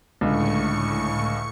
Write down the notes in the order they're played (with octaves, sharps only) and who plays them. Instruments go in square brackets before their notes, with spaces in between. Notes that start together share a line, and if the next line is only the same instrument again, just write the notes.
[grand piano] C#2 D3 [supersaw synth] A2 C#6 C#7